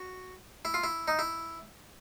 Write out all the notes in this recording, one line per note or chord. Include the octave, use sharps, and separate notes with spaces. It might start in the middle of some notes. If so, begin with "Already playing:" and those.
Already playing: F#4
E4
F4
E4
D#4
E4